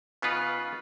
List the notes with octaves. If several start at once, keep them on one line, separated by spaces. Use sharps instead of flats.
C#3 B3 D#4 F4 B4